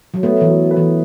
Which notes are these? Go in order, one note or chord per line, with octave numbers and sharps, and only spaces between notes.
F#3
A3 B3
E3
F#3
B4
E3